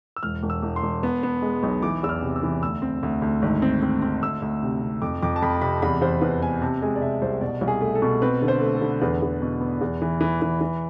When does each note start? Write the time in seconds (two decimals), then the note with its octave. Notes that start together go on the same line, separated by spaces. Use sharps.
0.16 E6
0.23 E1 F6
0.43 E1
0.50 E6
0.62 E1
0.76 C6
0.82 E1
1.03 B3
1.23 B3
1.42 G#3
1.63 B1
1.83 E3 D6
2.03 E2 E6
2.09 F6
2.22 C3
2.36 E6
2.43 E3
2.63 D2 E6
2.82 C4
3.03 D2
3.22 D2
3.42 G#1
3.62 C4
3.82 C4
4.02 C4
4.22 D2 E6
4.42 D2
4.63 C3
4.82 C3
5.02 F2 D6
5.22 F2 D6
5.36 A5
5.42 F2 B5
5.61 C3 B5
5.82 E2 B5
6.01 E2 C5
6.21 E2 B4
6.42 B3 G#5
6.61 C3 A5
6.82 G#3 G#5
6.96 D5
7.01 C3 E5
7.22 C2 C5
7.41 B2 D5
7.61 C2
7.68 G#4
7.81 A3
7.95 A4
8.02 B2
8.22 C4 B4
8.42 D3
8.48 C5
8.61 A3
8.75 A4
8.81 D3
9.01 E2 B4
9.22 E2
9.42 B2
9.61 B3
9.81 E2
10.02 E3
10.21 E3
10.42 E3
10.61 E3